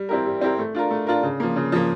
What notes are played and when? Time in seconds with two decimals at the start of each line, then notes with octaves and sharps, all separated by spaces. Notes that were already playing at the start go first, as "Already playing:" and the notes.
Already playing: G3
0.09 C4 E4 G4 A#4
0.26 G3
0.41 C4 E4 G4 A#4
0.59 A3
0.75 D4 F4 A#4
0.91 A3
1.07 D4 F4 A#4
1.23 C#3
1.40 F3 A#3
1.56 C#3
1.72 F3 A#3